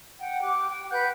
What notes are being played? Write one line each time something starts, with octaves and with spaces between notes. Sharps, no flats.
F#5 G5
G4 D6 F#6
G5
B4 F#5 F#6 G6